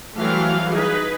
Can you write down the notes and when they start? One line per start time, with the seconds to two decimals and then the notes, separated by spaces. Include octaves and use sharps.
0.16 E3 F#3 G3 A3 C4 F5
0.72 D#4 G#4 B4